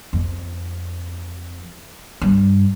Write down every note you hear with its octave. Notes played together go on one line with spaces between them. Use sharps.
F2
G2